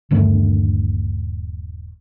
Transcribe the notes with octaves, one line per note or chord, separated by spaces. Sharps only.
D#1 G2 D3 A3